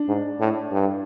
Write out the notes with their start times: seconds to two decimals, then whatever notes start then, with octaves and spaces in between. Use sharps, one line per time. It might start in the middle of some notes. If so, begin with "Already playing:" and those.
Already playing: D4
0.08 G#2
0.40 A2
0.71 G2